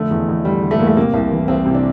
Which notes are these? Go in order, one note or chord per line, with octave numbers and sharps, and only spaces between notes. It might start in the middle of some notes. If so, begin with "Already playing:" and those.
Already playing: F2 D3 A3
E2
E2
D3 G3
D3
A3
E2 A#3
A3
C3 A#3
C2
E3
C2 C4
C3
D4